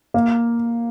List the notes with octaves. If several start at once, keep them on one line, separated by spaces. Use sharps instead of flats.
A#3